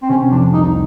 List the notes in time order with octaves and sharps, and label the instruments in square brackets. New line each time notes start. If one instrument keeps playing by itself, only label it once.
[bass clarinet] C4
[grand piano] C3 [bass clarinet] C#4
[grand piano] F2 [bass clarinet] D4
[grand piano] C2 [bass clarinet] D#4